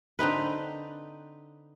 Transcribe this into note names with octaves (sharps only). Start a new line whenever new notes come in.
D3 C4 D#4 B4